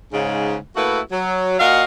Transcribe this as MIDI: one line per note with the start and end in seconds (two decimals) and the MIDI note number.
0.12 0.56 44
0.12 0.56 49
0.76 0.99 57
0.76 0.99 58
0.76 0.99 64
0.76 0.99 66
0.76 0.99 71
1.11 1.57 54
1.59 1.83 46
1.59 1.83 66
1.59 1.83 75
1.59 1.83 77